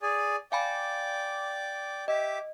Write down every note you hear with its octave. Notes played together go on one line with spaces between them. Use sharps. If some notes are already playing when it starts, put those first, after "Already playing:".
G#4 D5 G#5
D5 F5 G5 G#5 B5 D6
G4 D#5 E5 D6